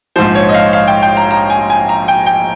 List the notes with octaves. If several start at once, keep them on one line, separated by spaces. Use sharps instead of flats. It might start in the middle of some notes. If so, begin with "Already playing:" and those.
A#1 G#2 F3 C5
C#5
D#5
F5
F5
G5
G5
A#5
A#5
G#5
G#5
A#5
G5
G5